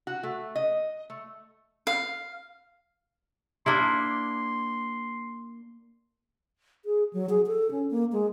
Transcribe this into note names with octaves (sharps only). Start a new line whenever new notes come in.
F#4
A3
D#5
A3
F5
A#3 D4 E4 C6
G#4
F#3
G#4
A4
C#4
A#3
G#3